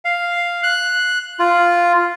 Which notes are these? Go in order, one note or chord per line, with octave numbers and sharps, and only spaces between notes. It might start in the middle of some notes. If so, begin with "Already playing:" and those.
F5
F#6
F4